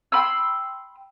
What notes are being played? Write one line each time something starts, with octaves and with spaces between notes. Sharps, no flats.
G5 B5 C6 E6